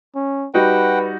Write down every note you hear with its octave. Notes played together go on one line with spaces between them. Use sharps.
C#4
G3 D#4 F#4 B4 F#5 G5